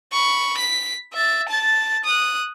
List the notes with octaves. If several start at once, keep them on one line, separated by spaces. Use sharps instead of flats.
B5 C#6
B6
E5 A6
A5 A6
D#6 F#6